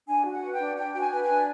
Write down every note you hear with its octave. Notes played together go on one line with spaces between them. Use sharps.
D4 G#5
F#4
F#5
B4
G5
D4
D4 G5
F#4 G5
G#5
B4
G#5
D4